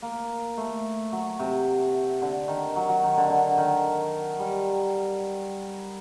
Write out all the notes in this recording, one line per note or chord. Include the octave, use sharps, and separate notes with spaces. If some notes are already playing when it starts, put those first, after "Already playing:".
A#3
A3
F#3
C3
D3
D#3
F#3
F#3
D#3
D3
D3
D#3
G3